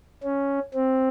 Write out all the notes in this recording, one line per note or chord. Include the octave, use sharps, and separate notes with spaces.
C#4
C4